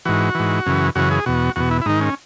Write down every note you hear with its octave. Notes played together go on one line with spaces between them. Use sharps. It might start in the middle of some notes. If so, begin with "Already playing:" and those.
G#2 E3 F#4
G#2 E3
F#2 C#3 E3
F#2 C#3 E3 F#4
G#4
E2 B2 F#4
E2 B2 F#4
E4
E4
G#2 D#3 D#4
C#4